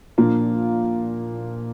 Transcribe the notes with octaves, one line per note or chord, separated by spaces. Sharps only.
A#2 F3 A#3 D4 F4